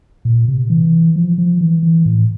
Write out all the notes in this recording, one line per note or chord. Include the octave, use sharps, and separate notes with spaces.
A#2
C3
E3
F3
F3
E3
E3
A2